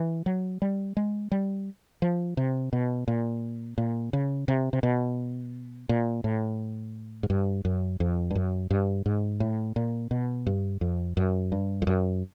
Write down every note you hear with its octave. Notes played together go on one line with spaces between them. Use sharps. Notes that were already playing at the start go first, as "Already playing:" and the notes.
Already playing: E3
F#3
G3
G#3
G3
F3
C3
B2
A#2
A#2
C#3
C3
C3
B2
A#2
A2
G#2
G2
F#2
F2
G2
F#2
G2
G#2
A2
A#2
B2
G2
F2
F#2
G2
F2
F#2